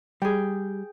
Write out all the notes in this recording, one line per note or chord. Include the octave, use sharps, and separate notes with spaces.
G3 G#4 G5